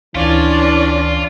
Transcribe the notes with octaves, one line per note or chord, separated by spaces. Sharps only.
D2 E3 C#4 D4 F4